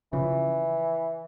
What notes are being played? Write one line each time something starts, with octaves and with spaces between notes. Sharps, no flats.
C#3 E3 F3